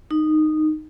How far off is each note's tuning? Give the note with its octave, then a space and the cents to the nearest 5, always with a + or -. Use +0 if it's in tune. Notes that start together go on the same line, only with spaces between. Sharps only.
D#4 -10